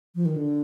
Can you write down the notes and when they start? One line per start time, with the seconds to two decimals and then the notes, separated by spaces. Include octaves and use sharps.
0.15 F3
0.25 D#3
0.36 D3